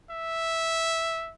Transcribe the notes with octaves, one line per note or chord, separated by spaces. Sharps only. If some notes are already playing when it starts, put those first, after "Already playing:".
E5